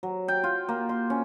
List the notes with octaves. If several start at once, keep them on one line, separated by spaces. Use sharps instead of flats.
F#3
G5
F4
A#3
C6
C#4